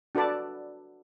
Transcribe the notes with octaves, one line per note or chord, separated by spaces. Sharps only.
D4 F#4 A4 B4 D5 A5